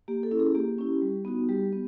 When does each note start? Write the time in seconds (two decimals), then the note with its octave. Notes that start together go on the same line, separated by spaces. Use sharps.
0.08 A#3 G4
0.23 A4
0.31 C#4 E4
0.40 G#4
0.55 A#3 G4
0.78 C#4 E4
1.02 G3
1.25 B3 D#4 F#4
1.49 G3 G4
1.73 B3